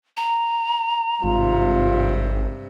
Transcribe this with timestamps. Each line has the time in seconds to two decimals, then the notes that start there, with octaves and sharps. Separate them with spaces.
0.17 A#5
1.23 G#1 G2 C3 F4